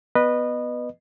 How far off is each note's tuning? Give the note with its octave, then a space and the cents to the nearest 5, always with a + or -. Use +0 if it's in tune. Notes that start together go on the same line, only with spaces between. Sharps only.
B3 +0 B4 -5 D#5 -25